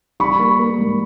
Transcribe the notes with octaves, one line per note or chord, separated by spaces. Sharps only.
G3 B5 C#6
A#3
A#3
G#2